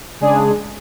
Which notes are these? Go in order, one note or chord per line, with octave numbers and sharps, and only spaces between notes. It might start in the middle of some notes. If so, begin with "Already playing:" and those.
C#3 G#3 D4 G#4